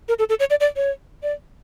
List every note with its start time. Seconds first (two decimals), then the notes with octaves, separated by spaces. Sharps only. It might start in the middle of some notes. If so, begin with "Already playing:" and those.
0.08 A#4
0.19 A4
0.29 A4
0.40 C#5
0.50 D5
0.60 D5
0.76 C#5
1.23 D5